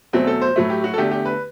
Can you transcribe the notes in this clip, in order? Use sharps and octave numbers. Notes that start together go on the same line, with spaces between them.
E2 B2 F#3 A3 C4
A4
C5
A2 F#3 A3
G4
F#4
A4
E2 D3 A3 G4
G4
B4